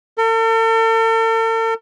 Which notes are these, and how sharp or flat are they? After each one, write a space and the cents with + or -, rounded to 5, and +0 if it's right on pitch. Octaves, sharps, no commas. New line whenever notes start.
A4 +45